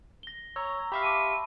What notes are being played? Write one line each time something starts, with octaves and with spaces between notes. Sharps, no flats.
A#6 G7
C#5 A#5 C#6 E6
G4 E5 F5 B5
A5 C6 D6 D#7